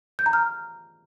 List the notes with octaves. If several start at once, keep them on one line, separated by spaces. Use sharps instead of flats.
G6
A#5
F6